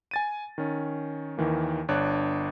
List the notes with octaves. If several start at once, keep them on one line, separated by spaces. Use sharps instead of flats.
G#5 A6 D#7
D#3 C#4
D#2 D#3 E3 A#3
G1 D4 C#5 F#6